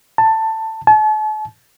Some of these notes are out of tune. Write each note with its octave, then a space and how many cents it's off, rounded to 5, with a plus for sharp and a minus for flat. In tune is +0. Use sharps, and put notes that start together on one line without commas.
A5 +15
A5 -40